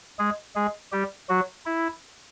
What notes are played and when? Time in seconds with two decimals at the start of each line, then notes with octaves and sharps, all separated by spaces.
0.19 G#3 G#4
0.56 G#3 G#4
0.92 G3 G4
1.29 F#3 F#4
1.66 E4